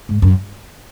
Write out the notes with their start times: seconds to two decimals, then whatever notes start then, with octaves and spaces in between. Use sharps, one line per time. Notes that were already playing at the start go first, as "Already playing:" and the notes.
0.09 G#2
0.22 F#2